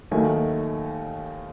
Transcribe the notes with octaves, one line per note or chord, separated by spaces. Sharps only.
D#2 D#3 F#3 A3 G#5